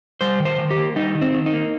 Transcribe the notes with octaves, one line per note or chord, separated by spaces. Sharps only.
G3 C5
D#3
C5
D#3
G4
A#3
G3 D#4
D#3
C4
D#3
D#4
A#3